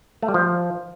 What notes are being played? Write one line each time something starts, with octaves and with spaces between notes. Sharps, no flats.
A3
G3
F3